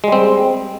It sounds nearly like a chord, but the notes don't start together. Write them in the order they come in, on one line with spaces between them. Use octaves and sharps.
G#3 G3 C4